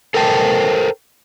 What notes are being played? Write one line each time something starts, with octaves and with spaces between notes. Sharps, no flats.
A4 A#4 C5 G5 A5